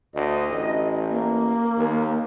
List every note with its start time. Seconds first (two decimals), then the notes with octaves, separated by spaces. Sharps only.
0.15 D2 D#5
0.50 A1
1.10 A#3
1.78 D#2